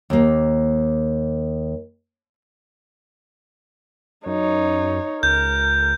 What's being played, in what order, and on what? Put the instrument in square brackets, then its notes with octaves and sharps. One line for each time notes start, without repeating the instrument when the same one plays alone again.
[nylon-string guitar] D#2 A#3
[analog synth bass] F#2 [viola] D#4 C#5
[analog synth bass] C#2 [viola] A#4 [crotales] G6